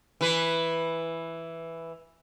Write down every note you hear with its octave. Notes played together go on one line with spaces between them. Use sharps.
E3 B4